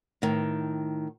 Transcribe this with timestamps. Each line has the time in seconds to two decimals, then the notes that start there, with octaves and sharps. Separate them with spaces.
0.22 A2 D#3